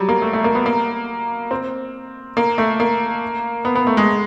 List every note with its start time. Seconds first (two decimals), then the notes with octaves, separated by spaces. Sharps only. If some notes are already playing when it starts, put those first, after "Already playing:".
Already playing: F#3 G3
0.09 A#3
0.22 A3
0.33 A3
0.44 A#3
0.55 B3
0.66 A#3
1.51 C4
2.37 A#3
2.58 A3
2.80 A#3
3.65 B3
3.76 B3
3.87 A3
3.97 G#3